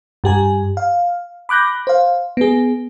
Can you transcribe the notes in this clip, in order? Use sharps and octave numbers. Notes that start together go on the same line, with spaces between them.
G2 G4 G#5
F5
B5 D6 F#6 G6 A#6
C5 F5
B3 G#4